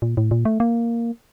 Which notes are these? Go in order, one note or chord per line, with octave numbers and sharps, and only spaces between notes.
A#2
A2
A#2
A3
A#3